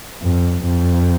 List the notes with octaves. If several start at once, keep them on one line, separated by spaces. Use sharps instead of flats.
F2
F2